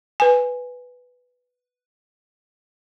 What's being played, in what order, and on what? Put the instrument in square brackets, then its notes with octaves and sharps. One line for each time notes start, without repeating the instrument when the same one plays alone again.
[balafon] B4 G#5